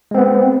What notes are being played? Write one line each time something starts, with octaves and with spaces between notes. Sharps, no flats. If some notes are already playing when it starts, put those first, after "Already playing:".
G#3 B3 C4